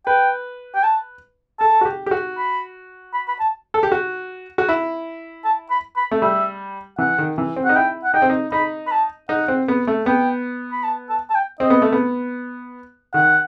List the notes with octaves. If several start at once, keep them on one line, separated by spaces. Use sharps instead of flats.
B4 G5
G5
A5
A4 A5
F#4
G4
G4
F#4
B5
B5
B5
A5
A4
G4
F#4
F#4
E4
A5
B5
B5
A3
G3 E5
E3 F#5
D#3
E3
C4
D#4 F#5
E4 G5
F#5
D#4 G5
C4
D#4
D#4 B5
B5
A5
D#4 F#5
C4
B3
A3
B3 G5
B5
A5
A5
A5
G5
C4 D#5
B3
A3
B3
D#3 F#5